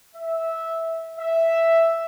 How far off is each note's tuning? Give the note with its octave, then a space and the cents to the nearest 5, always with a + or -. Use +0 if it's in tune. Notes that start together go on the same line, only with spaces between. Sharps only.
E5 -10
E5 +0